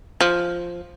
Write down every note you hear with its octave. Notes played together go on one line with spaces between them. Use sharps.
F3